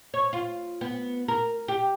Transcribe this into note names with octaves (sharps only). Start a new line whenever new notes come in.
C#5
F4
B3
A#4
G4